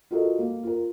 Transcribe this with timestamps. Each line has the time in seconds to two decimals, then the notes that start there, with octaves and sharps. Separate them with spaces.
0.11 F4 F#4 A4 A#4 D#5
0.39 A#3
0.63 F4 A#4